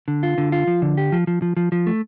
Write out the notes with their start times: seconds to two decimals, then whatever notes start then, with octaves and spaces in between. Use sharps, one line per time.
0.08 D3
0.23 F4
0.38 D3
0.52 F4
0.67 F3
0.82 D3
0.97 G4
1.12 F3
1.27 F3
1.42 F3
1.57 F3
1.72 F3
1.87 A3